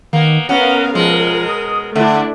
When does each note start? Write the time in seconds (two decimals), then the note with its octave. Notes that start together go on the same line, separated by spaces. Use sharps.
0.13 D#3 A#3 B3
0.49 B3 C#4 A#4 F5 F#5
0.95 B2 F3 G#3 A#4
1.48 D#6
1.95 D3 A3 D4 E4 E5